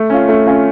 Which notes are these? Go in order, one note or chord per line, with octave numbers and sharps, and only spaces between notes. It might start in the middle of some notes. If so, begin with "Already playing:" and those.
Already playing: A3
C#4 F4
A3
C#4 F4